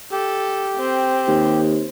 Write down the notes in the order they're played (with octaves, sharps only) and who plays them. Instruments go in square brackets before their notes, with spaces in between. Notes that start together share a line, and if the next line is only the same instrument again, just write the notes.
[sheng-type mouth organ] G4 [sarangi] A4
[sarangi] C4
[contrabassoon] D#2